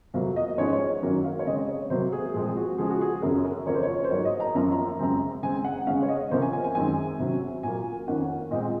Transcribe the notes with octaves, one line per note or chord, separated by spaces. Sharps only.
F2 C3 F#3 A#3 F5
D#5
G#2 F3 G#3 C#4 C#5
C#5
F#2 D#3 F#3 A#3 C#4
F5
C#5
C#3 G#3 C4 D#5
C#5
C3 F#3 A#3 C5
G#4
A#2 F3 G#3 C4 G#4
F#4
C#3 F3 G#3 G#4
F#4
G#4
F#2 C#3 F#3 C#4 A#4
A#4
F2 C#3 F3 A#3 C#5
C5
C#5
C5
G#2 F#3 A#3 C#5
D#5
A#5
F#2 F3 A#3 C#4 A#5
A#5
A#5
F#2 C#3 G#3 C4 A#5
C#3 G#3 C4 G#5
F#5
C#3 G#3 C#4 F5
C#5
D#5
C3 F3 A#3 C#4 C5
G#5
G#5
G#5
F#2 D#3 G#3 C4 G#5
C3 F#3 C#4
A#2 F#3 A#3 G#5
F2 D#3 A#3 C#4 F#5
A#2 G#3 C4 D#5